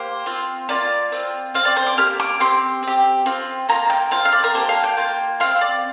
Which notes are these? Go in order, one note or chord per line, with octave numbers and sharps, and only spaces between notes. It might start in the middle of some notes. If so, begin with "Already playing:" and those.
Already playing: A#3 G4 C5
C4 F4
A#3 F4 D5
C4 F4
C4 F4 F5
D5
C5
D6
A#3 G4 F6
D6
C4 G4 C6
C4 G4
C4 F4
A#3 F4 A#5
G5
C4 F4 F5
F5
D5
A#4
A#3 D4 G4 C5
F5
G5
A#3 F4
C4 F4 F5
D5